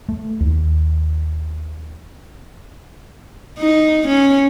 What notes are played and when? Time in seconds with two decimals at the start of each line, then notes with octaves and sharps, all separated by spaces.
0.09 A3
0.40 D#2
3.59 D#4
4.08 C#4